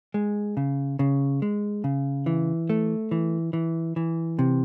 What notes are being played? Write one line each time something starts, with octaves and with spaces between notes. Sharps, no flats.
G#3
C#3
C#3
G#3
C#3
E3
A3
E3
E3
E3
C3